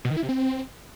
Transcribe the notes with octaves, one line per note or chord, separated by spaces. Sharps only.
B2
D#3
E4
C3
C4